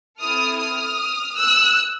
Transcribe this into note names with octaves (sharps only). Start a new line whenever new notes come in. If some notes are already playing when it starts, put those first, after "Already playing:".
C4 E4 A4 D#6 F6
D#6 F6
E6 F#6